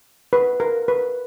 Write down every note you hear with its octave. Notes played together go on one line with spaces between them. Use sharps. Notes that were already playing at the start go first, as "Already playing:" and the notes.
B4
A#4
B4